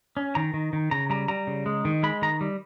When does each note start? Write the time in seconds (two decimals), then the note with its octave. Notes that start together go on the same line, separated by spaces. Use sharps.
0.17 C#4
0.35 D#3 A#5
0.54 D#3
0.73 D#3
0.91 C#3 A#5
1.10 G3 A#5
1.28 G3 A#5
1.47 C#3
1.66 G#3
1.85 D#3
2.03 G#3 B5
2.22 D#3 A#5
2.41 G3